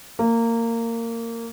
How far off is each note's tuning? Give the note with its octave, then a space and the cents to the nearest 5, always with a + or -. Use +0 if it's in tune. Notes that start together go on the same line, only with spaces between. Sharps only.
A#3 -20